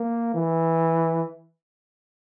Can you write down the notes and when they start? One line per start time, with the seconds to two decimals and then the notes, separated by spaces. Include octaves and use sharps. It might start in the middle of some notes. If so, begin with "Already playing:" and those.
Already playing: A#3
0.34 E3